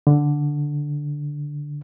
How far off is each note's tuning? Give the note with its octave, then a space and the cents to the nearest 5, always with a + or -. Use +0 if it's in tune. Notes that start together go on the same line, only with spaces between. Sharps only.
D3 +0